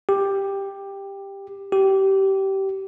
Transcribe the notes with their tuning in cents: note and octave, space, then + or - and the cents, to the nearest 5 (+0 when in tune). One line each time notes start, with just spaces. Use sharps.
G4 +10
G4 -20